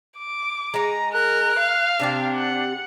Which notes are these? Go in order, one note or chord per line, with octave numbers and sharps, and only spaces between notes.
D6
G#3 D#4 A#5
A#4 F#6
F5
C3 C4 D4 G4
F#5